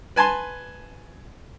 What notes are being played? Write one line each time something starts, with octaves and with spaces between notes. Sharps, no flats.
B4 G#5 A5 C6